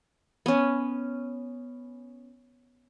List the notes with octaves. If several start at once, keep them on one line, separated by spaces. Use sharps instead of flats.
B3 C#4